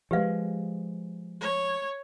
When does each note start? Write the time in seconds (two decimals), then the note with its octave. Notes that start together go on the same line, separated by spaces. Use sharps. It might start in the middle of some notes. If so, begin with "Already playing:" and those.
0.11 F3 G#3 G4 B4 F5
1.41 C#5